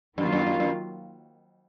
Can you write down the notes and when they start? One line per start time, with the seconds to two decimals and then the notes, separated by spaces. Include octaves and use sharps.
0.18 F#2 D#3 F#3 A#3 F4
0.33 F#2
0.47 F#2
0.60 F#2